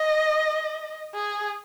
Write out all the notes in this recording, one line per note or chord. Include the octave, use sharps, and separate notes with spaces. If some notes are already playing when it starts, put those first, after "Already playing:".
Already playing: D#5
G#4